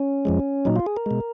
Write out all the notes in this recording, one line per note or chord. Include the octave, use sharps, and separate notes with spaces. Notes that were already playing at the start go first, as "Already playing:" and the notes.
Already playing: C#4
F2 F3 G#3
A#2 F#3 D#4
F4
G#4
A#4
B2 G#3